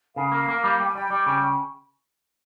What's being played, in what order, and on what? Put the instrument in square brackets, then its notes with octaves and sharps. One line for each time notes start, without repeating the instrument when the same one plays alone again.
[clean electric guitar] C#3 [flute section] F5
[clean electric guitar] A#3
A#3
G3
[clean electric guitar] G3 [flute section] G5
[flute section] G#5
[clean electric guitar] G3 [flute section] G5
[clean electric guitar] G3
C#3